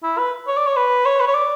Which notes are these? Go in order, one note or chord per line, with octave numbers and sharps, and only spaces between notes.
E4
B4
C#5
D5
C#5
B4
C#5
B4
C#5
D5